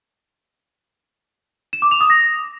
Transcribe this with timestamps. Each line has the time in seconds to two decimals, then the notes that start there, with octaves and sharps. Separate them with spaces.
1.73 E7
1.82 D6
1.91 F7
2.01 D#6
2.10 A#6